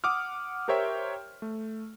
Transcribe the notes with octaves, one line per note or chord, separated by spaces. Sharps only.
F#5 D6 D#6 F6
G4 A#4 C5 C#5 E5 G5
A3